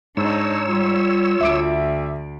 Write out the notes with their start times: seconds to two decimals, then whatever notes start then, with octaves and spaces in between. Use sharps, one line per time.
0.17 G#2 D4 D#4 C#5 E6
0.67 G3 F4
1.41 D2 E5 D6 D7